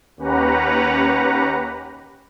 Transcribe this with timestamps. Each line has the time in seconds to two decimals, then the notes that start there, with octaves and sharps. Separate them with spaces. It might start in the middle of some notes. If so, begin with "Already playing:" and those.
0.17 D#2 C#4 G4 B4 F#5 A#5